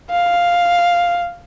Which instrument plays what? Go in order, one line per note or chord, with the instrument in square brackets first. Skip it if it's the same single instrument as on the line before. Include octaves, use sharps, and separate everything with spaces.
[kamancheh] F5